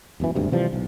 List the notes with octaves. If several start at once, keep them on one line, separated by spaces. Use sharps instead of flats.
E1 B1 F#2 E3
G#1 D2 G2 C3
C3 E3 F3 G3
B1